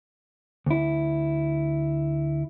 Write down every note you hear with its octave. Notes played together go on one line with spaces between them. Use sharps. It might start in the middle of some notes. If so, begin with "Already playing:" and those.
D2 E4